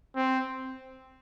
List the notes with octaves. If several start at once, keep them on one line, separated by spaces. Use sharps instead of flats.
C4